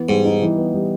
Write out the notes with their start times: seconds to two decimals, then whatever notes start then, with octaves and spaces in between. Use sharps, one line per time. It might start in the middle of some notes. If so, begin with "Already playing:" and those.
Already playing: E3 B3
0.08 G#2 G3
0.25 D#4
0.42 E3
0.58 B3
0.74 G3